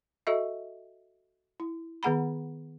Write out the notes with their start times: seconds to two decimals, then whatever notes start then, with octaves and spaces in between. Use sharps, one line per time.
0.27 F#4 A4 D#5 E5
1.60 E4
2.03 D#3 B3 G#4 F#5 A#5 B5